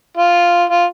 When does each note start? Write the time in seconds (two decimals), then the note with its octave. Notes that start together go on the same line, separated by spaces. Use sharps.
0.17 F4
0.69 F4